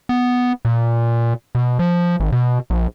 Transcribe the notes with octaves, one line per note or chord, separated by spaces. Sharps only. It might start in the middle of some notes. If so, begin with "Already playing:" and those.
B3
A#2
B2
F3
G#1
B2
A#1